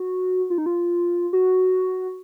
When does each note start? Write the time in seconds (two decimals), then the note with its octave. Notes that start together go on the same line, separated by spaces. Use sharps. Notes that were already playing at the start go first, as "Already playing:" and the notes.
Already playing: F#4
0.50 F4
0.58 D#4
0.66 F4
1.33 F#4